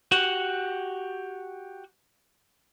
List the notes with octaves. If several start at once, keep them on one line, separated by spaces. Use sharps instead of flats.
F#4 G4 F#5